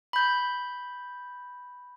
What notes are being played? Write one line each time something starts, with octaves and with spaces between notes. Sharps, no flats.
B5 G6